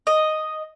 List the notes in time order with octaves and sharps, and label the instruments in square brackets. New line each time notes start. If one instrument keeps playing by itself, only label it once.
[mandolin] D#5